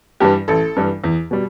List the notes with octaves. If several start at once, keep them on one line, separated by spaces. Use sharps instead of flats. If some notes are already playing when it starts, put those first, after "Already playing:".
G2 E3 G3 G4
A1 A4
G2 E3 G3
E2
B2 G3